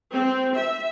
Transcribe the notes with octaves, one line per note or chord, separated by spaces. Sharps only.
C4
E5